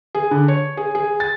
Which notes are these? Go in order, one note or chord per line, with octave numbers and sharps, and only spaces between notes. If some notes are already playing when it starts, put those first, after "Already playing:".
G#4
D3
C#5
G#4
G#4
A6